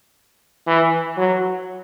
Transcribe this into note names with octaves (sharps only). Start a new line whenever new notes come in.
E3
F#3